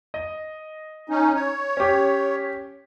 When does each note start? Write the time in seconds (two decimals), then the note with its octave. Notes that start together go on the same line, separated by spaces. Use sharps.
0.14 D#5
1.09 C#4 D#4
1.35 C#5
1.77 C#4 G4